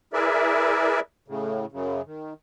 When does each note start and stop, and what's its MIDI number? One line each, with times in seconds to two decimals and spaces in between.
0.13 1.00 64
0.13 1.00 68
0.13 1.00 70
0.13 1.00 71
0.13 1.00 74
0.13 1.00 76
1.28 1.66 45
1.28 1.66 49
1.72 2.02 42
1.72 2.02 49
2.06 2.34 51